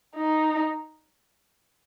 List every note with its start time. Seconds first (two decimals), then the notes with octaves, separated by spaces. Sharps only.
0.16 D#4